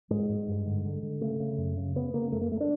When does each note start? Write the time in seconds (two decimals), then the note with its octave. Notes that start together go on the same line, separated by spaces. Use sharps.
0.10 G#2 G#3
0.29 G#2
0.48 G2
0.66 D3
0.85 D3
1.03 D3
1.21 C#3 A3
1.40 C#3
1.58 F#2
1.77 C#3
1.96 C#3 B3
2.14 C#3 A#3
2.32 F#2 A3
2.41 A#3
2.52 A3
2.60 D4